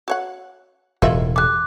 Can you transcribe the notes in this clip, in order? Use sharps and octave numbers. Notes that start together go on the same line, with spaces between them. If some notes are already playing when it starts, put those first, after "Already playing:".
F#4 C#5 F#5
E1 A2 F4 D#5 E5
G3 A3 D6 F#6